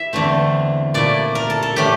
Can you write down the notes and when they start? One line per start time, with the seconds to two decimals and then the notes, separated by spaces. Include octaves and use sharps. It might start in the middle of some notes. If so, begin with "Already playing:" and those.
Already playing: E4 E5
0.13 E2 D3 A3 C4
0.94 A#2 A3 E4 D5
1.35 A#4
1.50 A4
1.63 A4
1.76 A2 E3 A3 D4 G4